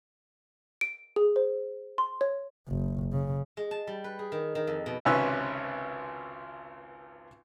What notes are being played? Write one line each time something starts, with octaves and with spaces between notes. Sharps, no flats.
D7
G#4
C5
C6
C#5
F#1
C#3
G#3
A5
G3
B4
G#4
D#3
D#3
F2
B2
G#1 C#2 C3 C#4 B4 E6